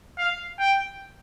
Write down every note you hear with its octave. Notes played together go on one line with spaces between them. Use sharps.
F5
G5